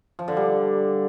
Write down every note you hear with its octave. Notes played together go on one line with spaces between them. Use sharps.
F3
D3
G3